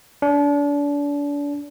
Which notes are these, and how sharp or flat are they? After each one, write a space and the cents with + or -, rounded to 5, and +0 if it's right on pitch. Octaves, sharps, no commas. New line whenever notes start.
D4 -35